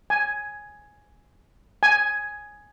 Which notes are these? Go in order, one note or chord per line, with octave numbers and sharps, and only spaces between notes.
G#5
G#5